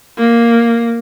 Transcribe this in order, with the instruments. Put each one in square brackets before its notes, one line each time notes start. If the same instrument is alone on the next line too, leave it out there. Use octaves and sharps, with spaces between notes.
[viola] A#3